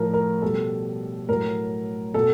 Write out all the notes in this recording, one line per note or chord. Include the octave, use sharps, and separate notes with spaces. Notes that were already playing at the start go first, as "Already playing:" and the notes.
Already playing: A2 F3 A#4
A#4
B2 G3 A4
A2 F#3 A#4
B2 A4